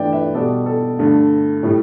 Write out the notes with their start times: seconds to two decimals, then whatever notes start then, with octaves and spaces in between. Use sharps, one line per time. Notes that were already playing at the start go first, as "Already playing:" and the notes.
Already playing: G2 E3 A3 B4 D5 E5 G5
0.13 B4 E5
0.34 B2 G3 A4 D5
0.66 A4
0.98 G2 D3 A3 A4
1.63 A2 G3